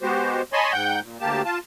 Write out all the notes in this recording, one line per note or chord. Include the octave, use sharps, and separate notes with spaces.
G#3 B3 F#4 G4 C5
C#5 D#5 G#5 A5 B5 C6
G#2 F#5 G5 G6
A#2
D2 A#3 G4 A5
F4 A5